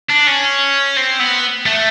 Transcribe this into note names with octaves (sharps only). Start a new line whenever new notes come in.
D4
C#4
C4
B3
A3